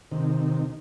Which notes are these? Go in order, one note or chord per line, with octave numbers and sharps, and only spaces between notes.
C3 D#3